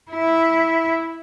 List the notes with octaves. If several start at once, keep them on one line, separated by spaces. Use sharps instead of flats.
E4